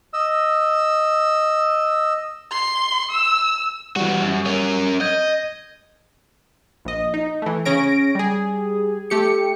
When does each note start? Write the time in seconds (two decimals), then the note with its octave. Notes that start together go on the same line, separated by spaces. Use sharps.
0.13 D#5 E6
2.51 C6
3.11 E6
3.96 E3 G3 F#4
4.22 F#2
4.46 C#4 A#4
5.01 D#5 G6 G#6
6.85 A#1 D#5
7.14 D#4
7.42 E3 A3
7.65 C#3 C#4 A#6 D7
8.15 G3 G#4
9.10 A3 G4 C#7